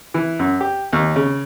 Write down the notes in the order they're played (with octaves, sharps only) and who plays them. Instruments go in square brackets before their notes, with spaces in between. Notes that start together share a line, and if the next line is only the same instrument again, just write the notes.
[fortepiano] E3
F#2
G4
D#2
C#3